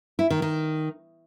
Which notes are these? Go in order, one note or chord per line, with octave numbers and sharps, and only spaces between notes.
E4
D#3
D#3